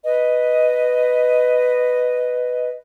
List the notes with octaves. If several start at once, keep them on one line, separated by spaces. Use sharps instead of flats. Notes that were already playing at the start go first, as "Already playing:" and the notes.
B4 D#5